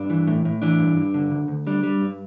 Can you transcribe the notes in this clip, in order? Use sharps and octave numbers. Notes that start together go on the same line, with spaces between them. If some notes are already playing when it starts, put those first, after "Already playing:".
Already playing: G2 D4
E3
A2
A2
E3 D4
G2
G2
D3
D2
D2
G3 D4
G3
G2